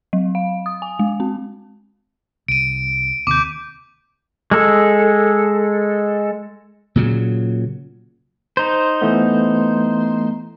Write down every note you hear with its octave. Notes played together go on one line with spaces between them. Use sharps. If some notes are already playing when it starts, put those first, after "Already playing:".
F#3
F5
D#6
G#5
G#3
C4
C2 D7 D#7
D#2 C3 D6 G6
G#3 A4
A#2 C#3 F#3
D#4 C5
E3 A3 B3